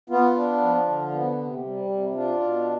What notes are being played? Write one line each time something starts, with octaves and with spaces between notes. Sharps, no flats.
B3 F4
D4
F3
D3
B3
C3
G3
C3
D4 F4
B2